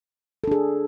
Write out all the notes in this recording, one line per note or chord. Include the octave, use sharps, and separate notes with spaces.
D4 G#4 A4